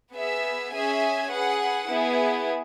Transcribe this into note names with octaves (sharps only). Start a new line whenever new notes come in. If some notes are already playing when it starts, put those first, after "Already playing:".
B3 G#4 E5
C#4 G#4 E5 G#5
G#4 B4 F#5
B3 E4 G#4